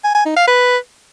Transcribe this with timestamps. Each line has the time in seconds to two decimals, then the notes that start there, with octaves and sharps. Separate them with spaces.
0.04 G#5
0.15 G#5
0.26 D#4
0.37 F5
0.47 B4